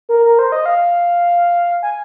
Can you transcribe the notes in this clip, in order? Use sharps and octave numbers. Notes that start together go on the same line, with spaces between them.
A#4
A#4
C5
D#5
F5
G#5